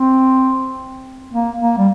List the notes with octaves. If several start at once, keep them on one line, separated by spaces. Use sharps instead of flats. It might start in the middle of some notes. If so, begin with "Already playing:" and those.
Already playing: C4
A#3
A#3
G3